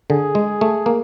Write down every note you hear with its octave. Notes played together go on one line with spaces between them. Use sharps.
D3 G#4
G#3
A3
A#3